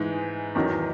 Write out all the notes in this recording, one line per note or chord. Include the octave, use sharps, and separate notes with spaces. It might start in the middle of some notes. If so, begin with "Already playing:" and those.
Already playing: G#2 E3 G#3 D#4
E2 D#3 F#3